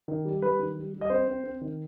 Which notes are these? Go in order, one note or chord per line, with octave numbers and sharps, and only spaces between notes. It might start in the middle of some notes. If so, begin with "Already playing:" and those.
D#3
G3
G3 B4
D#3
G3
G3
D#5
C4 C5
C4
C4
D#3